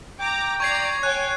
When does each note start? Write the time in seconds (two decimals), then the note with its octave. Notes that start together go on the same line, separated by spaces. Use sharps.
0.20 G5 A#5 D6
0.60 D5 A#5 C#6 G#6 C7
1.03 C#5 G5 G#5 F#6